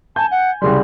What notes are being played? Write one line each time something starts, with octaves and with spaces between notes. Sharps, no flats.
G#5 A5 G6
F#5
C2 C#3 G3 C6